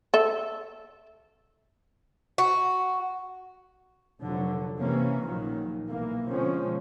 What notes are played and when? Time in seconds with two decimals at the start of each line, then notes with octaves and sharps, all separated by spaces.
0.14 A4 E5
2.38 F#4
4.22 F1 D3 F#3
4.79 C3 E3 A#3 C#4
5.24 A#1 A#2 D#3 F#3
5.88 B1 E3 A#3
6.30 B2 D3 F3 G#3 C4 C#4